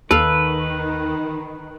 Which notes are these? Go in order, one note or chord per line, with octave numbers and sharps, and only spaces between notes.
D#2 D#3 A4 B4 F5